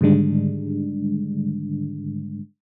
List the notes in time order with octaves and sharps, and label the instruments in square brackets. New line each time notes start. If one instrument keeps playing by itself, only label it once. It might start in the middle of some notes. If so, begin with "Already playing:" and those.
[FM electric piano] G#2 D3 D#3 G3 G#3 D4